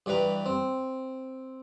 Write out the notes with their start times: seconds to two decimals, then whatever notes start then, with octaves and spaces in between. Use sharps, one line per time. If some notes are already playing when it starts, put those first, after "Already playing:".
0.06 G2 E3 G3 B4 A#5
0.46 C4